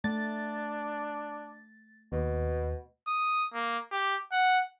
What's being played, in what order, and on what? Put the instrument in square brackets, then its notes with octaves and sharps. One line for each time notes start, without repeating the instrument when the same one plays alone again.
[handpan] A3 [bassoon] D4 [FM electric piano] A6
[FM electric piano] D#2 [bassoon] B2
[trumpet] D#6
A#3
G4
F#5